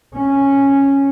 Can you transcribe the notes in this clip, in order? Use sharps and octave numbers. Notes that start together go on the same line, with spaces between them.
C#4